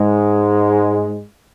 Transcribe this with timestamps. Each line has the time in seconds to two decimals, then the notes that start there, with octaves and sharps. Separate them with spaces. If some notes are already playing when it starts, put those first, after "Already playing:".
Already playing: G#2 G#3